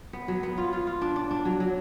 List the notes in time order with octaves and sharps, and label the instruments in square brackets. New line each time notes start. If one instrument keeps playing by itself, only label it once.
[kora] B3
F#3
B3
F4
F4
F4
D4
D4
D4
F#3
F#3